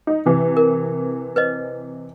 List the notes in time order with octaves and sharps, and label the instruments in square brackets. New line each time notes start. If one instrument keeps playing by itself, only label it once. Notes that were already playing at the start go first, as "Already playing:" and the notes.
[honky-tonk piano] D#4
C3 E3
[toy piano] A#4
B4 C5 D#5